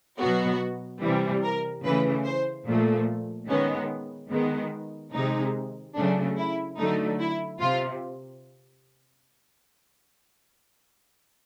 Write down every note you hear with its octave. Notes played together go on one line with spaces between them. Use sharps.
B2 F#3 B3 F#4
C3 E3 G3
A#4
C#3 E3 A3 B4
C5
A#2 F3 A3
D#3 G#3 B3 C#4
D#3 G#3 B3
C3 D#3 G#3 D#4
C#3 F#3 A3 D4
E4
D3 F#3 A3 D#4
E4
C3 F4